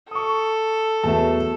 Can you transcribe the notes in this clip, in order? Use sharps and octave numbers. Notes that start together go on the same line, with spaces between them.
A4 C#6 D#6
E2 F#3 A3 B3 A5